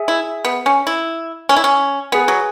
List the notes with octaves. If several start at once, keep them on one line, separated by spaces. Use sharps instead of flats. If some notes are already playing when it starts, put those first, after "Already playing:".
Already playing: G#4 E5 G#5
E4
B3
C#4
E4
C#4
E4
C#4
B3 G#4 B4 G#5
F#3